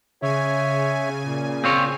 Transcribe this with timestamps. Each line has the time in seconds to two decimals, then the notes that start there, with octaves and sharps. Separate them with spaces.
0.22 C#3 C#5 E5 G#5
1.25 A#2
1.64 C4 F4 C#5